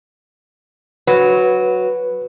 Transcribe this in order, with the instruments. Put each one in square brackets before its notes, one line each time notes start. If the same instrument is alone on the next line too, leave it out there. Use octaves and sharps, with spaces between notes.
[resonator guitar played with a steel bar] F#3 [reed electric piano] B4